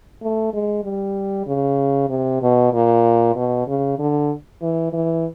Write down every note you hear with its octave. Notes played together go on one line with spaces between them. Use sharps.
A3
G#3
G3
C#3
C3
B2
A#2
B2
C#3
D3
E3
E3